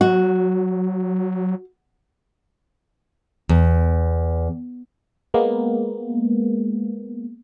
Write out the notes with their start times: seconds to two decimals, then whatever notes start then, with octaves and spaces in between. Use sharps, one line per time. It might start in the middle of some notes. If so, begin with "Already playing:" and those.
0.01 F#3 F#4
3.49 E2
5.34 G#3 A#3 B3